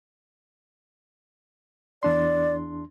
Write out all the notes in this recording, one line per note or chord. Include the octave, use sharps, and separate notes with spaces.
E2 D4 D5 C6